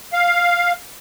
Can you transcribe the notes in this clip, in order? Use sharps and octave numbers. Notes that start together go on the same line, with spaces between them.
F5